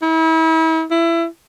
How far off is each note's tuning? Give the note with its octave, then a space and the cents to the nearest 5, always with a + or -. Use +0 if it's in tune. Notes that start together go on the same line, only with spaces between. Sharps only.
E4 -35
E4 +25